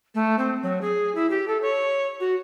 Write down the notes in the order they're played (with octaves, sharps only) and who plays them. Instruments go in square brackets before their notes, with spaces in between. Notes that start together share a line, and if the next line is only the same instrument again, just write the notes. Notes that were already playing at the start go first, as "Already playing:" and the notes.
[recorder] A3
C4
F#3
G#4
E4
G4
A4
C#5
F#4